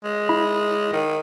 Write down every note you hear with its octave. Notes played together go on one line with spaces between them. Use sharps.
G#3
E4 B5
D#3